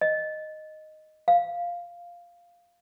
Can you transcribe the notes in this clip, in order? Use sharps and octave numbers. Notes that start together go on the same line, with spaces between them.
D#5
F5